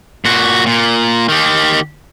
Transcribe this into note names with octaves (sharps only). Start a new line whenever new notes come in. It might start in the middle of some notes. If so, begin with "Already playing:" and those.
A#2 F#4
A#2
D#3 G4